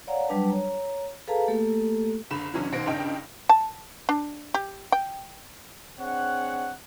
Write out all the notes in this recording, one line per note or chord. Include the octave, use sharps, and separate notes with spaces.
C#5 D5 F5 F#5 A#5
F#3 G3 D4 B4 A5
C#5 A#5
G#4 A4 B4 F5 A5 A#5
A3 A#3 G4 A4
F#1 D3 B5 E7
G#2 C#3 E3 F#3 C#4 D4
D#2 B2 C5 A#6 D7
C#2 G2 C#3 D4 D#4 G5
A5
D4
G4
G5
C4 D4 G#4 C#5 F#5